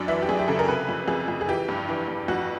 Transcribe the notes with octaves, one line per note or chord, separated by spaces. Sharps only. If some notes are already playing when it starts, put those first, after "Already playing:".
Already playing: F#2 D4
E3 E4
G4
F#2 G#4
G4
C#3 A4
A#4
C3 B4
F2
F2 G#4
F2
G#4
E3 G4
G2
E3
G2
F2 F#4